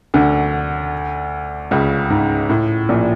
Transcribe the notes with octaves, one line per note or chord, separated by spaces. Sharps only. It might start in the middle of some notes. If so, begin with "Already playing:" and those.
D2 D3
C#2 C#3
G#2
A2
A#1 A#2